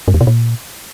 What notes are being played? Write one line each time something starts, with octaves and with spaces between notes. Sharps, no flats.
G2
E2
B2
A#2